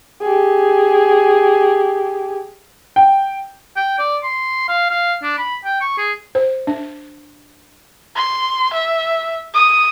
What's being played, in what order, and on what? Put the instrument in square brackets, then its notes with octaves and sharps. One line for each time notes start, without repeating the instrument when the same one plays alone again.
[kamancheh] G4 G#4
[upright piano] G5
[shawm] G5
D5
C6
F5
F5
D4
B5
G5
C#6
G#4
[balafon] C5
D4
[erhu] C6
E5
D#6